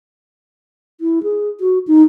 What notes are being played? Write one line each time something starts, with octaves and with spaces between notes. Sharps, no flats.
E4
G#4
F#4
D#4